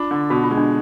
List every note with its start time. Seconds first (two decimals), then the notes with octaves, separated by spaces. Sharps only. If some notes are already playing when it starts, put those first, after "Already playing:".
Already playing: D4 F4
0.11 D3
0.30 B2 F#4
0.43 F4
0.51 G#3
0.57 D4